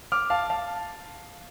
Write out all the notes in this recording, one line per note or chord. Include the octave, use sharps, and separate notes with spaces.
D6 F6
F5 A5
F5 A5